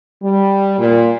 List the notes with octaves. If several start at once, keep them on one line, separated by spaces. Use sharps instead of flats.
G3
A#2